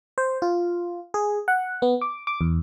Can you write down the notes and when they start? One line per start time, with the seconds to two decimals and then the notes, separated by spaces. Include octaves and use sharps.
0.18 C5
0.42 F4
1.14 G#4
1.48 F#5
1.82 B3
2.01 D6
2.27 D6
2.41 E2